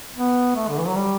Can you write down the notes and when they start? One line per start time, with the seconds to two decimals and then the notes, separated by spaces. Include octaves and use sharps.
0.15 B3
0.56 A3
0.68 D3
0.78 E3
0.87 F#3
0.96 G3